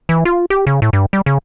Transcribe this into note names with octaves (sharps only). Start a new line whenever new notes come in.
E3
F4
G4
C#3
A2
G2
G3
C#3